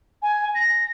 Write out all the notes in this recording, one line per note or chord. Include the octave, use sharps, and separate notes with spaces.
G#5
A#6